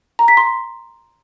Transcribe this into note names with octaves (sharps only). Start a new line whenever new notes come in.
A#5
B6
C6